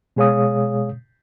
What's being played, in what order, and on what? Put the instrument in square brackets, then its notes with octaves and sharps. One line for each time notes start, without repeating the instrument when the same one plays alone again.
[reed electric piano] B2 G#3 G#4 C#5 F5 D#6